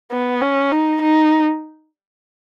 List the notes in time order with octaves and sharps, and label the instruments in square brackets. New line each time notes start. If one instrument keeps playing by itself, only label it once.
[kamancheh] B3
C#4
D#4
D#4